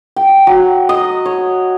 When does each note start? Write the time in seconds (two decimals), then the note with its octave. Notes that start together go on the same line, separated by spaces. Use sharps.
0.16 G5
0.47 F#3
0.89 D#5
1.26 C#5